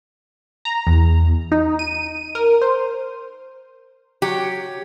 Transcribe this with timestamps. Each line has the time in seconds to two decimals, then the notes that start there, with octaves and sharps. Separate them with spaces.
0.65 A#5
0.87 E2
1.52 D#4
1.79 D#7
2.35 A#4
2.62 C5
4.22 F#3 G4